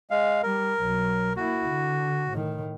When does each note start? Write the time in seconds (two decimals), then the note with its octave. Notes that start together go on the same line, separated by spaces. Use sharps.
0.11 G#3 F5
0.43 G3 A#4
0.80 B1 F#3
1.37 A#3 E4 F#4
1.69 D3
2.30 A2 D#3